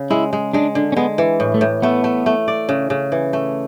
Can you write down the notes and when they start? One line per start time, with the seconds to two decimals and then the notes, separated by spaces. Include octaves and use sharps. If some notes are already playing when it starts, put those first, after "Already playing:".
Already playing: C#3
0.11 G#3 E4
0.33 G#3
0.53 G#3 D4
0.75 D3
0.92 C#4
0.96 G#3 B3
1.18 E3
1.40 A2
1.54 A3
1.61 A2
1.82 A3 B3
2.04 A3
2.26 A3
2.48 D5
2.69 C#3
2.90 C#3
3.12 E3
3.33 A3